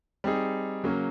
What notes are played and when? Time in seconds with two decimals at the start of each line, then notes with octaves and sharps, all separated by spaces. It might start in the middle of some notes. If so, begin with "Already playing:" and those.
0.24 G3 C4 D#4 G#4
0.84 C#3 F#3 A#3 C#4